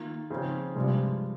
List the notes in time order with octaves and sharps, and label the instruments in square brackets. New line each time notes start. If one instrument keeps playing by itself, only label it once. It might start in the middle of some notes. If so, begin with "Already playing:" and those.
Already playing: [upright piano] D#3 A#3 F4
C#3 F3 C4 D#4 G#4
[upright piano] G2 F3 G#3 [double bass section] C3